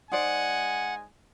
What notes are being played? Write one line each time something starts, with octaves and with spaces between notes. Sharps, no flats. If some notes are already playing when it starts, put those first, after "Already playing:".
G#3 D#4 C5 D5 F#5 G#5